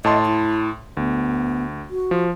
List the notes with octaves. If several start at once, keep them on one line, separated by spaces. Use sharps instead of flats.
A2 D#5 A5 C6
E4
D2 B3
F#4
F3